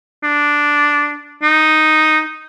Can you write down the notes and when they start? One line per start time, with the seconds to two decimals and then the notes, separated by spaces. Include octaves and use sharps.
0.23 D4
1.43 D#4